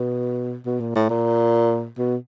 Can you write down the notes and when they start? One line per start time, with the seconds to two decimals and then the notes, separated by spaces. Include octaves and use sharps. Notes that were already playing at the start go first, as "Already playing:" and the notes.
Already playing: B2
0.66 B2
0.80 A#2
0.96 A2
1.10 A#2
1.98 B2